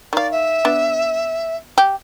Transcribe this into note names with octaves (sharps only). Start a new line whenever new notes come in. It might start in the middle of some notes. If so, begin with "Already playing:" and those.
D#3 D5 F5
E5
B3 D4
G4